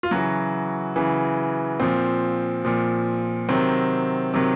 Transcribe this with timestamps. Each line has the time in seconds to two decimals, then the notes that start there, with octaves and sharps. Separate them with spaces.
0.03 F4
0.11 C#3 E3 F#3 F#4
0.96 C#3 E3
1.80 A#2 F3 C4
2.65 A#2 F3
3.49 C3 D#3 F#3 C4
4.34 C3 D#3 F#3